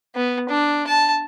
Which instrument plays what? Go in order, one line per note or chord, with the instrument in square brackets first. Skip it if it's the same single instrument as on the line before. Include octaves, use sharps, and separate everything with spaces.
[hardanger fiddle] B3
D4
A5